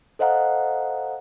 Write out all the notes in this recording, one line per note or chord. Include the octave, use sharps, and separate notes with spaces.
A4 C5 D#5 F5 F#5 A#5